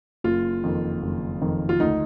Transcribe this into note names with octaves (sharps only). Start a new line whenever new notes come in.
F#1 F4
F2 D#3
F#1
F2 D#3
F4
D2 D#4